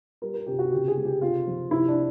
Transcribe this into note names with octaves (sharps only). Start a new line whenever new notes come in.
G3 A#4
A#4
C3 G4
F#4
C#3 G4
G#4
G#3
G4
C3 F4
F3
C3 E4
D4